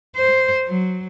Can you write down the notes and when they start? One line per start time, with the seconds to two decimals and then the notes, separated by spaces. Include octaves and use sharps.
0.16 C5
0.68 F#3